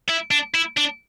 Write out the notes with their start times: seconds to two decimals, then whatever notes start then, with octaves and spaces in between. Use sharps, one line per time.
0.09 E4
0.31 D4
0.54 E4
0.77 D4